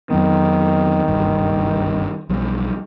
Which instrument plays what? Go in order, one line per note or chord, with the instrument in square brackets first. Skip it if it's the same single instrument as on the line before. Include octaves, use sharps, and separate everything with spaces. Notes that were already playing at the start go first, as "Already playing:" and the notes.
[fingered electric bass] F2 F#3 B3 [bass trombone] D#3
[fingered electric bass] F#1 C2 G2
B1 F3 G3